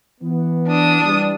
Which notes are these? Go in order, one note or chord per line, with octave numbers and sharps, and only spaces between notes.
E3 B3
D4 D#6
E3 G3